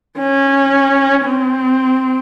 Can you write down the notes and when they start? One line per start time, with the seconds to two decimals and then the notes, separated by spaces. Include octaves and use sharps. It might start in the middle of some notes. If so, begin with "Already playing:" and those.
0.18 C#4
1.26 C4